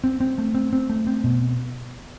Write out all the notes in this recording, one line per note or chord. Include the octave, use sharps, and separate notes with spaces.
C4
C4
A3
C4
C4
A3
C4
B2